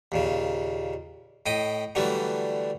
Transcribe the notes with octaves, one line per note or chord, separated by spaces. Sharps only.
D#2 A#2 C#3
A2 D#5 G5 B5
D3 E3 F#3 G3 A3